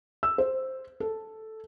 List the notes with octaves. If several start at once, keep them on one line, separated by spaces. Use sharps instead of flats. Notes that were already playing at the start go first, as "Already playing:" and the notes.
E6
C5
A4